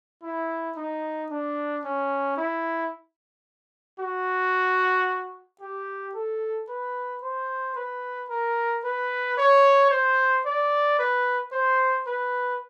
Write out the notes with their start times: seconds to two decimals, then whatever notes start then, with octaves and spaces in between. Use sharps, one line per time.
0.23 E4
0.77 D#4
1.30 D4
1.84 C#4
2.37 E4
3.99 F#4
5.61 G4
6.14 A4
6.69 B4
7.23 C5
7.76 B4
8.30 A#4
8.84 B4
9.38 C#5
9.91 C5
10.46 D5
10.99 B4
11.52 C5
12.07 B4